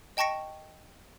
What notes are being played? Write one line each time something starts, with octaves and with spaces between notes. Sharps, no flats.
D#5 G5 A5 C#6 A#6 C#7